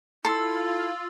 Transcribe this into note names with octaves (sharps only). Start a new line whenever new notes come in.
E4 F4 A4 C6 E6 A6